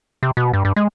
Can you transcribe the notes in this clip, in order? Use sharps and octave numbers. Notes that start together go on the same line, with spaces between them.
C3
B2
G2
G2
G#3